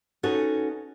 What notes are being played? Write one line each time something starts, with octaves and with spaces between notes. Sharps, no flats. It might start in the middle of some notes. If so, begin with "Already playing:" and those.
C#4 D#4 F#4 A4 B4 C#5